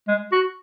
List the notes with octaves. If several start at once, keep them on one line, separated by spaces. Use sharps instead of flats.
G#3
F#4